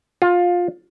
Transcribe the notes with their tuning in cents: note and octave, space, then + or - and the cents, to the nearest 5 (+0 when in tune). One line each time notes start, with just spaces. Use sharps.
F4 +20